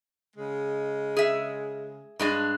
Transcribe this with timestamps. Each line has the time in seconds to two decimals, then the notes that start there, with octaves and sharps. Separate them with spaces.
0.36 C#3 G#3
1.17 G#4 E5
2.19 G2 G#3 D4